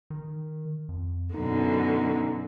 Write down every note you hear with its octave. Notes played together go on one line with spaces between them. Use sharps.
D#3
F2
F#2 B2 D3 D#4